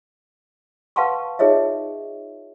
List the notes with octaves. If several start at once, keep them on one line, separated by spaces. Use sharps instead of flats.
B4 F5 F#5 A5 C6 C#6
D#4 F4 G#4 C#5 D#5 E5